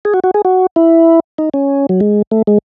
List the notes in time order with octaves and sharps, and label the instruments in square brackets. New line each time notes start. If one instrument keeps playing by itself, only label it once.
[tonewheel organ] G#4
F#4
F#4
G#4
F#4
E4
D#4
C#4
F#3
G#3
A3
G#3